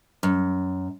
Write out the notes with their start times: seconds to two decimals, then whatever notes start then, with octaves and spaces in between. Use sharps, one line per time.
0.23 F#2